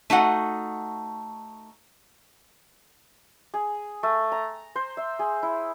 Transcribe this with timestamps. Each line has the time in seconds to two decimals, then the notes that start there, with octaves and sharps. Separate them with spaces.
0.10 A3 D#4 F#4 F#5
3.54 G#4
4.03 A3
4.32 A#5
4.76 C5
4.97 E5
5.19 G#4
5.43 E4